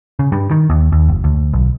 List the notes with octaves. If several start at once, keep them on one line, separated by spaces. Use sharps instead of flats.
C#3
G2
D#3
D#2
D#2
F#1
D2
B1